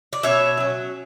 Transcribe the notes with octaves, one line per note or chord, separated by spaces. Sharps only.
D5
B2 C#5 E5
F#3 C#4